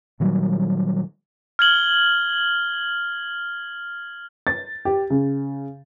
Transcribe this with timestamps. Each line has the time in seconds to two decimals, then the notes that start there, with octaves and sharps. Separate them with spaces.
0.20 A#2 D#3 F#3 G3
1.59 F6 G#6 F#7 G7
4.47 A6
4.85 G4
5.10 C#3